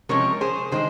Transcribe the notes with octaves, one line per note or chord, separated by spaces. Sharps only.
C3 F3 G#3 C#4 A#4 C#5
G#4 C5
D#3 G#3 G#4 C5